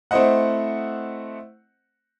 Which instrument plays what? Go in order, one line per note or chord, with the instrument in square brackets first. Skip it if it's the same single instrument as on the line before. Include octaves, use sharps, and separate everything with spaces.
[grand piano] A3 C4 E4 C5 D#5 F#5